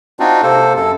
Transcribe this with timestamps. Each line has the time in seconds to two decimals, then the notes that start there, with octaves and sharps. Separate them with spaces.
0.20 C4 D4 D#4 F4 F#4
0.42 C3 A#3 A4 C5
0.77 F#2 A4